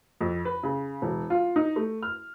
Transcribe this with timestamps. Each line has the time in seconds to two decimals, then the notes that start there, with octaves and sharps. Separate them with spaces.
0.21 F2
0.45 B4
0.63 C#3
1.02 E1
1.30 F4
1.56 D#4
1.76 A3
2.03 F6